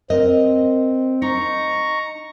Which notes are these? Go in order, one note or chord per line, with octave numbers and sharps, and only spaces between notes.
C4 A#4 D#5
D#4 A#5 C#6